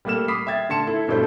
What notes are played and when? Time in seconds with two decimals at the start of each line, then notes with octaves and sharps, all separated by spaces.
0.05 G3 A3 A#3 A4 F6 E7
0.28 B5 D6 D#6 B6 C7
0.47 E5 G5 G#6 A6
0.69 D3 A3 A5 C6 C#7 E7
0.87 E4 A4
1.08 G2 B2 A3 A4 C5 G6